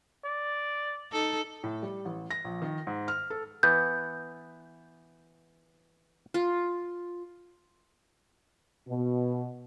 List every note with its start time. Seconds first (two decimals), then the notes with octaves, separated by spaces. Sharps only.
0.25 D5
1.12 D#4 A4
1.64 A2
1.82 G3
2.05 A1
2.31 A#6
2.44 A#1
2.62 D#3
2.87 G#2
3.08 F6
3.30 A4
3.63 E3 B3 G6
6.34 F4
8.87 B2